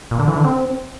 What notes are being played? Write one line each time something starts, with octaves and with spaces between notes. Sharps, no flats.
A#2
D3
E3
D3
C4